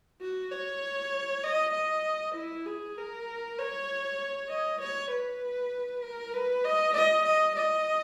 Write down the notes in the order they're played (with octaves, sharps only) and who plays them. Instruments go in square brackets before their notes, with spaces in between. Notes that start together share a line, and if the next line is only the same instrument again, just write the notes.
[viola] F#4
C#5
D#5
D#5
E4
G#4
A#4
C#5
D#5
C#5
B4
A#4
B4
D#5
D#5
D#5
D#5